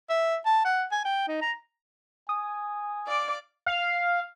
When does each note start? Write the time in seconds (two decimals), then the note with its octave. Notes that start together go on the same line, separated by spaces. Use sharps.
0.10 E5
0.46 A5
0.65 F#5
0.92 G#5
1.05 G5
1.28 D#4
1.42 A#5
2.29 G#5 D#6
3.07 D5 F5 D6
3.66 F5